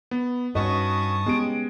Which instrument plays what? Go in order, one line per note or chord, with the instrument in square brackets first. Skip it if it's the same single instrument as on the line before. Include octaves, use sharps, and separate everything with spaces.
[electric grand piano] B3
[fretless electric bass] G2 [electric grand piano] C#4 F#4 B4 [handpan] D#5 [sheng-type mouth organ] A5 C#6 D#6
[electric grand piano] G#3 D7 [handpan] B3 C#4 G4